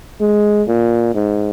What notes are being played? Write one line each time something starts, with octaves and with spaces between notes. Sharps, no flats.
G#3
A#2
G#2